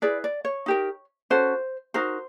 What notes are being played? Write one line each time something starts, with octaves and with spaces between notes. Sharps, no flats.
E4 G#4 B4 D5
D5
C#5
D#4 G4 A#4
C#4 F#4 A4 C5
D#4 F#4 A#4 C5